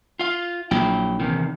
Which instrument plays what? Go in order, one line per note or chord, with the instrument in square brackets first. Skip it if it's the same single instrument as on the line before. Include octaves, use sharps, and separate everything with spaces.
[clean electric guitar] F4 F5
[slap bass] A#1 [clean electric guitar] F#3 E4 G5
[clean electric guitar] E2 C3 D#3